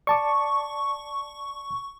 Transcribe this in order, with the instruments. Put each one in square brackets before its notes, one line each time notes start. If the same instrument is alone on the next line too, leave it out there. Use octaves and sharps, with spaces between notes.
[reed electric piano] D5 A5 D6 [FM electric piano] C#6